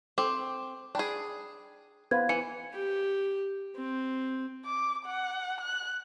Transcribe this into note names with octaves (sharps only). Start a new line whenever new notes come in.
C4 A4 D6
D4 G#4 G5 B5
B3 B4 C5 F5 G#6
E3 C#7
G4
C4
D6
F#5
F#6